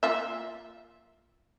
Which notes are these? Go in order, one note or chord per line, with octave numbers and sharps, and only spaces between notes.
A#3 F4 E5